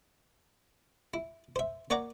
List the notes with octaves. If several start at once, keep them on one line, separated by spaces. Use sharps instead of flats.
E4
C5 E5
A#3 C#5 D5 F#5 A#5